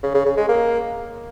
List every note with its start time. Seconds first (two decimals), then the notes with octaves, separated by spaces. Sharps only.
0.03 C#3
0.14 C#3
0.26 C#3
0.37 G#3
0.49 A#3